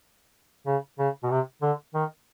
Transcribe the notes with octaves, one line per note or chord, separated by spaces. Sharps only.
C#3
C#3
B2
C3
D3
D#3